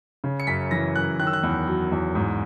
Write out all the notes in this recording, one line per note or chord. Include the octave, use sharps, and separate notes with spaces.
C#3
C#7
F#2 B6
E3 A#6
F#2 F#6
D#3 F#6
E6
F#6
E2
F#3
E2
G#2